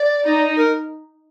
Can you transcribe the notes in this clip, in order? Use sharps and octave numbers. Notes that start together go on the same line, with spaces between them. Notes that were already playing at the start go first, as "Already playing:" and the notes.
Already playing: D5
D#4
A#4